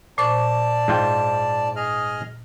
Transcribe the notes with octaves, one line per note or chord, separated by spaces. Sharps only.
A#2 C5 D5 A5 C#6
G#2 F4 G5
G#4 D#5 F6